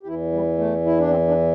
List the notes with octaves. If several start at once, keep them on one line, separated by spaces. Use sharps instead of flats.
G4
E2 E3 E4
G3
A3
E4
D4
C4
D4